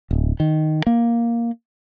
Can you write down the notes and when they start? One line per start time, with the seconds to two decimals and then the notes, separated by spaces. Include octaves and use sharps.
0.11 D1
0.40 D#3
0.87 A#3